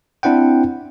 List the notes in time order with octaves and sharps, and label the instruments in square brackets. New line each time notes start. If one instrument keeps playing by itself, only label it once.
[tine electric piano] C4 D4 E4 C5 F#5 G5